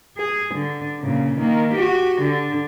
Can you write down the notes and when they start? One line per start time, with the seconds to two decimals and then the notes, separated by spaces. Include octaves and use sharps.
0.18 G#4
0.54 D3
1.00 A#2 C#3
1.39 D#3 A#3
1.73 F#4 G4
2.21 D3